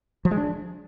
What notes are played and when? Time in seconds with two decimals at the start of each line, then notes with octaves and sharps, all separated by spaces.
0.25 F3
0.31 G#3
0.37 D4